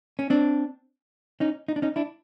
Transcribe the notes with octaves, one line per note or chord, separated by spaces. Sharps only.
C#4
C4 D4
C#4 D#4
D#4
D4
C#4 D#4
D4 E4